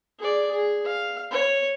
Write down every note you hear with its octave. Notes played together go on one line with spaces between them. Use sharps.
G#4 D5
G#4
F5
C#5